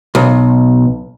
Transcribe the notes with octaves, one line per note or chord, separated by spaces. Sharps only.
B1